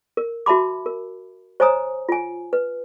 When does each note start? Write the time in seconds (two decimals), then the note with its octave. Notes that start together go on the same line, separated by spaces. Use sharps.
0.17 A#4
0.46 F#4 E5 A5 B5 D6
0.86 A#4
1.60 C5 C#5 D#5 G#5 A#5 D#6
2.09 F4 G#5
2.53 B4